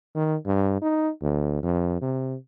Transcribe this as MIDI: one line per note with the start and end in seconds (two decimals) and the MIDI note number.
0.15 0.36 51
0.46 0.77 43
0.82 1.10 63
1.22 1.62 38
1.63 2.00 41
2.02 2.35 48